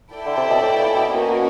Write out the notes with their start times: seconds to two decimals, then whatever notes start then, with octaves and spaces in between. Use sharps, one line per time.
0.13 E4 A4 D5 G5
0.26 D3
0.37 C3
0.50 B2
0.62 A2
0.79 A#2
0.94 B2
1.10 B2 A#3 C#4 F#4 A#4